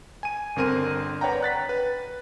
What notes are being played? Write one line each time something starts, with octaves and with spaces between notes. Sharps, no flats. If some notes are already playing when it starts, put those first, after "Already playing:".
G#5 D#7
G1 D3 C4 A#4 C6 D#7
B4 C#5 D5 F#5 G5 A#5
F#6 A6 B6
B4